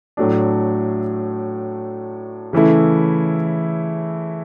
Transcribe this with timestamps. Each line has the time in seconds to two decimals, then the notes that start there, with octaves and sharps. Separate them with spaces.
0.17 A2 F#3 A3 D4
2.53 C#3 E3 A3 E4